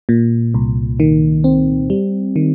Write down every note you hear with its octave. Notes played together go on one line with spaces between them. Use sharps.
A#2
C2
D#3
C4
G3
D#3